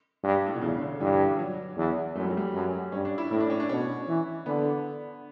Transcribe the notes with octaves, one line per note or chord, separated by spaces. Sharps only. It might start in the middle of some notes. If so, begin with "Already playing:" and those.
G2
A2
B2
E2 C#3
C#3
D3
G2 E3
F#3
E2
F#2 A3
G3
F#3
G3
F#2
G2 C#4
D4
E4
A2 E4
D4
C#4
D4
B2 C#4
E3
D3 B3